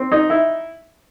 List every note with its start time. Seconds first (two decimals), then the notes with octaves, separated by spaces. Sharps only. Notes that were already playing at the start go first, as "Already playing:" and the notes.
Already playing: C4
0.12 D#4
0.30 E4